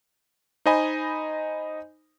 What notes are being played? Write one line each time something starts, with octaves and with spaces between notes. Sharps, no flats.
D#4 C5 D#5 G#5 B5